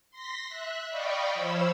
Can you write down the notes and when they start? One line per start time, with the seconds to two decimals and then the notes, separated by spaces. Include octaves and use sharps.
0.11 C6 A#6 B6
0.49 E5 F#6
0.90 D5 D#5 F5 G5 B5 C#6
1.33 F3 F4 C5 C#5 B5 E6